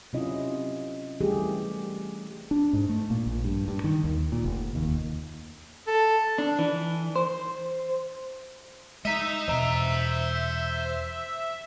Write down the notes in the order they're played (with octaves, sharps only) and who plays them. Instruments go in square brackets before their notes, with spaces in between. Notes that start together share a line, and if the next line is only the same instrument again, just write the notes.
[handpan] C3 F#3 C#4 E4 F4 D#5
E3 G3 A3 G4 G#4
[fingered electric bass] D4
G#2
A3
A#2
A#1
G2
G2
D#3
D#2
A#2
F1
D#2
[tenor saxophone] A4
[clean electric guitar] D4
E3
C5
[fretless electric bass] G#3 [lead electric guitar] D#5 A#5 [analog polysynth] E5
[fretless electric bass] E2 B2 [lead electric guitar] C5 A#5